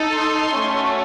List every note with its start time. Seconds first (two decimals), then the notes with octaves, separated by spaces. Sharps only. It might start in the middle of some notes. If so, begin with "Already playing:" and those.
Already playing: D#4 A4
0.10 C6
0.53 A3 C#4 F#4 A4